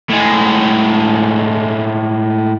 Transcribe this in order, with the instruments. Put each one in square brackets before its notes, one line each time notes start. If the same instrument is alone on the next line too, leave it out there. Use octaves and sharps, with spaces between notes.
[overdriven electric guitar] A2 G#3